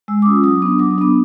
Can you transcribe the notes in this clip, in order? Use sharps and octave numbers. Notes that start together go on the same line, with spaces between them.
G#3 E6
D6
C#4 F4 D#6
F#3 D#6
B3 D4 D#6
F#3 D6
D#6
B3 D4 D6